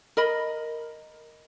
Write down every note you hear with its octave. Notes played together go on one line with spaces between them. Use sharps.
A#4 D#5 B5